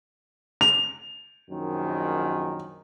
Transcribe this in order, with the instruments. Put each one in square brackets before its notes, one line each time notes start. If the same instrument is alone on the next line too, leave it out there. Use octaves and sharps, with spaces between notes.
[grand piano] F7
[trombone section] A#1 F#2 D#3